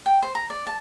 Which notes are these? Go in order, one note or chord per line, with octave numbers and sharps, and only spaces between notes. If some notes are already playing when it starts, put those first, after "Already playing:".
G5
C5
A#5
D5
A5